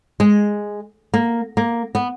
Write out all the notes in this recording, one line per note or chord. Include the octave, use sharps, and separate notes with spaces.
G#3
A#3
A#3
B3